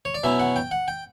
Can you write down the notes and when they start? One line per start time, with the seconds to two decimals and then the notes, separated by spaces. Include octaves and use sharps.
0.05 C#5
0.15 D5
0.24 B2 F#3 C#4 E4 E5
0.40 F#5
0.56 G5
0.71 F#5
0.88 G5